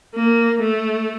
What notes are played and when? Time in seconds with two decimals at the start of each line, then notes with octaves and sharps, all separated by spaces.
0.15 A#3
0.61 A3